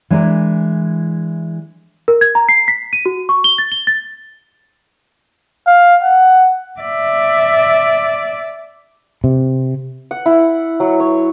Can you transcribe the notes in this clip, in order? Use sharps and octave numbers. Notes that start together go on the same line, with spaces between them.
E3 G#3 D4 E4 A#4
A#4
G#6
A#5
C7
B6
D#7
F#4
C#6
G7
A6
G7
A6
F5
F#5
D5 E5
C3
F#5
E4
F#3
C#5